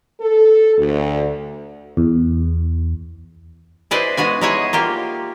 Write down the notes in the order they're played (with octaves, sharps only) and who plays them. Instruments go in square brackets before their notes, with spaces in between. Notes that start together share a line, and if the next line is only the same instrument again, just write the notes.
[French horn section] A4
D2
[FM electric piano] E2
[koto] E4 G#4 B4 C5 D5 D#5
G#3 B3 F#4 G#5
G#3 D#4 E4 G#4 C#5 D#5
A#3 F4 G4